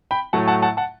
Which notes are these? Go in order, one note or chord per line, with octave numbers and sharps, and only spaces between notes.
G5 B5
A2 F#3 A3 F#5 A5
F#5 A5
F#5 A5
F#5 A5